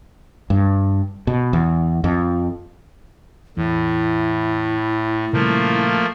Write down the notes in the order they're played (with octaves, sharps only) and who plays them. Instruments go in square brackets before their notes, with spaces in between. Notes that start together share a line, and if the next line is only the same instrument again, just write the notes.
[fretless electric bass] G2
B2
E2
F2
[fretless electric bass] E2 [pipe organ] A2 [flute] E4
[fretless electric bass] A#2 C#3 G3 [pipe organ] F3 A3 A#3